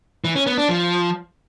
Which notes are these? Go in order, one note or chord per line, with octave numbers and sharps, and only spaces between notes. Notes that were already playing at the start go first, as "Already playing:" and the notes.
E3
C#4
B3
D4
F3